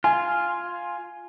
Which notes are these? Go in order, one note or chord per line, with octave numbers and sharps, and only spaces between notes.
F4 G#5